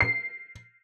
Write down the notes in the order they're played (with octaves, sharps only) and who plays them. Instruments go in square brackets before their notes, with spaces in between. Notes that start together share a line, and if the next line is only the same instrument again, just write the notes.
[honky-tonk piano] C7